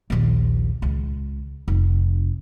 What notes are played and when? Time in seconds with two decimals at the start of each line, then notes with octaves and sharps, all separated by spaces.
0.10 A#1 D#2
0.82 C#2
1.68 F1